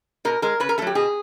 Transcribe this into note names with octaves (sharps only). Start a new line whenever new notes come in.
B2 A#4
G#3 A#4
C#3 B4
A#4
F#3 A3 G4 A4
B2 G#4